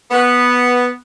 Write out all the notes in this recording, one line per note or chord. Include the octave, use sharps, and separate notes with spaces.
B3